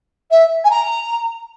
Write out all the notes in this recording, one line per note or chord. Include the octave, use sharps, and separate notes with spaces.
E5
G#5
A#5